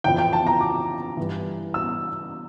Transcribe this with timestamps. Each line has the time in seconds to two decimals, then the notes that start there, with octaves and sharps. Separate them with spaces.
0.04 F2 E3 G5
0.18 G5
0.33 A5
0.47 A#5
0.61 D6
1.17 G2 E3
1.74 E6